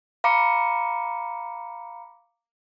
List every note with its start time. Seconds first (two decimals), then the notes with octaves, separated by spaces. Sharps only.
0.24 F5 A#5 B5 D6 C#7